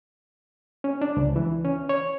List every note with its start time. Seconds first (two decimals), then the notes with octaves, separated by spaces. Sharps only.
0.84 C#4
1.02 D4
1.17 C#2
1.36 E3
1.65 C#4
1.89 C#5